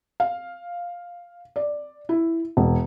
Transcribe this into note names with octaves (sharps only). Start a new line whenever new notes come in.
F5
D5
E4
E1